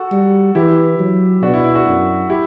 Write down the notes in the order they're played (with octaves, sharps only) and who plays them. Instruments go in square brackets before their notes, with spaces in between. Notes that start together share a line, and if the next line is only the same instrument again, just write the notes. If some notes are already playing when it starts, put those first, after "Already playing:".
Already playing: [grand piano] F#4 A4
[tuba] G3
[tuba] E3 [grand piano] E4 G4
[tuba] F#3
[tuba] B2 [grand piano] D4 F#4
[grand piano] E4
E4
D4 F#4
[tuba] F#2
[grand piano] E4 G4